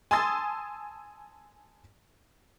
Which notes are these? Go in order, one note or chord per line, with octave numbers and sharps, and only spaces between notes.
G#5 A5 C6 D#6 E6 A6